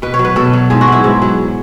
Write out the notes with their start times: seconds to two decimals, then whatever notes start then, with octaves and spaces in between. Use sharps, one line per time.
0.02 B2 B4
0.14 C#5
0.19 F#3
0.25 B4
0.36 B2 A4
0.53 F#3
0.70 G#2 G#4
0.81 F#4
0.88 F#3 E4
1.04 G#2
1.22 F#3